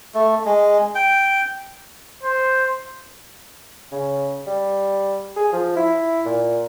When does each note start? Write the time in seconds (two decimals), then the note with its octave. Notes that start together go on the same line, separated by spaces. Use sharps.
0.15 A3
0.45 G#3
0.95 G5
2.23 C5
3.92 C#3
4.47 G3
5.36 G#4
5.53 F3
5.77 E4
6.26 A#2